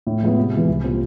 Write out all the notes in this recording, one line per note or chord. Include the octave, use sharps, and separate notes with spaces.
A2
F3 G#3 B3 E4
C3
E3 G#3
C2
A#2 G3 C4 F4